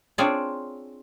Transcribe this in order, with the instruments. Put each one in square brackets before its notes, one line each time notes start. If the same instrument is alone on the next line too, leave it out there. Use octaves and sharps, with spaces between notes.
[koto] C4 D4 F4 G#4 C#5 D5